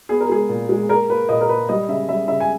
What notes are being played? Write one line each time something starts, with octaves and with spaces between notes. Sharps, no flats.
B3 G#4
A#4
G#3 G#4
A#2
G#3
A#3 A#4
A#3 B4
A#2 D#5
A#4
A#3 B4
G3 D#5
C#3 E5
G3 E5
C#3 E5
G#5